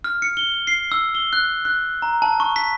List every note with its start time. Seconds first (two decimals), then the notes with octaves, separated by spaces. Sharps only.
0.04 F6
0.22 C#7
0.37 G7
0.67 C7
0.92 E6
1.15 G7
1.33 F#6
1.65 F#6
2.02 A#5
2.22 A5
2.40 C#6
2.56 B6